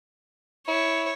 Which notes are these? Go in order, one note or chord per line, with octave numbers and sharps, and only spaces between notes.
E4 C#5